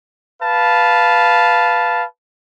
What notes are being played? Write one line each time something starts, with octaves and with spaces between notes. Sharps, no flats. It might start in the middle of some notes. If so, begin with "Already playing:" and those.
B4 F5 A5